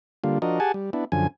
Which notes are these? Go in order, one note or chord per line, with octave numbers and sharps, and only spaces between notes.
D3 G3 A#3 F4
F3 D4 F#4 A#4 D#5
G4 G#4 F#5 G#5 A5
G3
B3 D4 E4
F#2 D3 F3 G#5